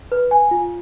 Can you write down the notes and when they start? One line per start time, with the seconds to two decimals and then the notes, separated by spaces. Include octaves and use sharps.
0.12 B4
0.31 G#5
0.51 F4